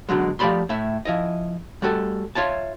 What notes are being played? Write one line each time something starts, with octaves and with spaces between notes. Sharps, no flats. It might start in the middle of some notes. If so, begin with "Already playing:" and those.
B2 D3 F#3 G#3
F3 A3 G4 D5 B5 C6
A2 A3 E5
F3 E4 D#5
G3 A3 F#4 A4
F4 C#5 E5 A5